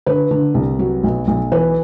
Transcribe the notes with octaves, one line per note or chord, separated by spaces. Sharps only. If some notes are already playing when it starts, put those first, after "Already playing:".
D3 B4
D3
C2
F#3
B1
B1
E3 B4